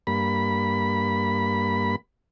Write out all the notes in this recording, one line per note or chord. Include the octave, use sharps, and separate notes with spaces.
G2 A#3 B5